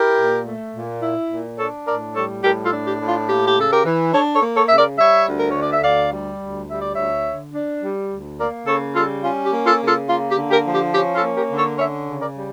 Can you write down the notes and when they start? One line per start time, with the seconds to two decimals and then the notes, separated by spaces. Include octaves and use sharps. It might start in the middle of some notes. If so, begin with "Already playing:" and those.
Already playing: E4 G4 A#4
0.17 A#2
0.46 A3
0.74 A#2
1.02 E4
1.30 A#2
1.58 D4 A4 C#5
1.87 A2 A#4 D5
2.15 G3 A4 C#5
2.44 A2 G4 A#4
2.65 F4 A4
2.72 D4
2.87 G4
3.01 A2
3.08 F4
3.29 A#3 G4
3.47 G4
3.57 C#3 A4
3.71 G4 A#4
3.85 E3
4.13 D4 A4 C#5
4.35 A4 C#5
4.42 A#3
4.56 A4 C#5
4.68 C#3 E5
4.78 A#4 D5
4.98 G3 C#5 E5
5.27 D2
5.38 A#4
5.50 C#5
5.55 D3
5.61 D5
5.73 E5
5.84 D2 D5 F5
6.12 G3
6.41 D2
6.69 G3 E5
6.81 D5
6.95 D2 C#5 E5
7.26 D3
7.54 D4
7.82 G3
8.10 D2
8.39 A#3 A#4 D5
8.67 C#3 A4 C#5
8.95 G3 F4 A4
9.23 C#4 F4
9.45 G4
9.52 A#3
9.66 F4 A4
9.81 C#3
9.87 F4 A4
10.09 A#3 F4
10.31 G4
10.37 D3
10.51 G4 A#4
10.66 F3
10.73 G4
10.94 C#4 G4
11.15 F4 A4
11.23 A#3
11.36 G4 A#4
11.51 D3
11.58 A4 C#5
11.78 C#4 C#5 E5
12.08 C#3
12.21 A#4 D5
12.36 G3